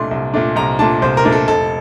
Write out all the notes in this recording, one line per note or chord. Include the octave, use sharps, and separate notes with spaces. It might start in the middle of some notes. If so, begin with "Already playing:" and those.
Already playing: C2 A#2 A3 D4 C6
C2
A#2 A3 D4
C2 A#5
A#2 A3 D4 A5
C2 C5
A#4
A#2 A3 D4
A4
F1 A4